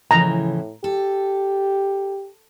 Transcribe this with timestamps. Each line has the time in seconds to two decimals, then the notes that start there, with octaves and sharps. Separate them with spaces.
0.11 A2 C#3 E3 F3 A#5
0.84 G4 A4